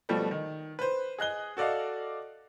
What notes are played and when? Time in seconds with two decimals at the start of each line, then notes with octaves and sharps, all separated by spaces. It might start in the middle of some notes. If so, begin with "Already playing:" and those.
0.09 B2 F3 G3 A3
0.31 D#3
0.79 B4 C5
1.19 G#4 D#5 F#6 G7
1.57 F#4 A4 D5 D#5 F5